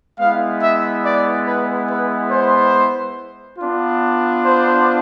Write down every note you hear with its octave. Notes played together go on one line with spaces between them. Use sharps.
G#3 B3 E4 F5
E5
D5
B4
B4
C5
B3 D4 F4
C5